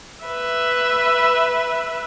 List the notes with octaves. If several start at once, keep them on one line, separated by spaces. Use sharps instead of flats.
B4 E5